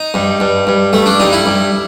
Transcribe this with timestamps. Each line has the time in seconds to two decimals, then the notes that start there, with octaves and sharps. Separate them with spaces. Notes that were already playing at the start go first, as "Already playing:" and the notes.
Already playing: D#4
0.14 G2
0.40 G2
0.67 G2
0.93 G2 A3
1.06 D4
1.20 G2 D#4
1.33 E4
1.46 G2